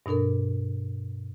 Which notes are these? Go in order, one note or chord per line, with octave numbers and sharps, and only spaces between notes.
G2 B2 D4 A4 A#4